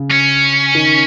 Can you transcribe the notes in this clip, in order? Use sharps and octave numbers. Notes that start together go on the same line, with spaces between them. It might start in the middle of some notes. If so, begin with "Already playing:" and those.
Already playing: C#3
C#4
D#3